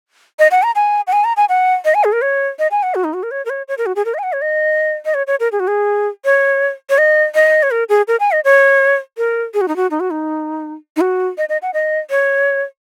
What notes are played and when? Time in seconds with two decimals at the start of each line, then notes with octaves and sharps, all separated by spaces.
0.39 D#5
0.51 F#5
0.63 A#5
0.76 G#5
1.07 F#5
1.13 G#5
1.24 A#5
1.37 G#5
1.49 F#5
1.85 D#5
1.95 G#5
2.04 G#4
2.13 A#4
2.22 C#5
2.59 D#5
2.71 G#5
2.83 F#5
2.95 F#4
3.04 D#4
3.14 F#4
3.23 A#4
3.31 C#5
3.45 A#4
3.50 C#5
3.68 C#5
3.78 A#4
3.86 F#4
3.96 G#4
4.05 A#4
4.14 D#5
4.19 G#5
4.23 F#5
4.33 C#5
4.42 D#5
5.05 D#5
5.14 C#5
5.27 C#5
5.40 A#4
5.52 G#4
5.60 F#4
5.68 G#4
6.25 C#5
6.90 C#5
6.98 D#5
7.35 D#5
7.63 C#5
7.71 A#4
7.89 G#4
8.08 A#4
8.20 G#5
8.32 D#5
8.44 C#5
9.18 A#4
9.54 G#4
9.61 F#4
9.68 D#4
9.76 F#4
9.91 D#4
10.00 F#4
10.11 D#4
10.96 D#4
11.01 F#4
11.38 D#5
11.49 D#5
11.62 F#5
11.74 D#5
12.10 C#5